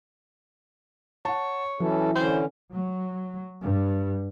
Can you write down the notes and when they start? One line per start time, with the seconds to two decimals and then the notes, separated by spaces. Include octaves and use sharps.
1.25 C#5 F#5 A5
1.80 E3 F#3 C#4 A4
2.16 D3 C#4 C5
2.73 F#3
3.61 G2